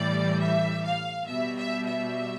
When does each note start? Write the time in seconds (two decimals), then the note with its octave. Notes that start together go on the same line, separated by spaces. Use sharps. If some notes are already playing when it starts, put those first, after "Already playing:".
Already playing: A2 E3 G3 D5
0.40 E5
0.84 F5
1.28 B2 G3 E5
1.57 E5
1.86 E5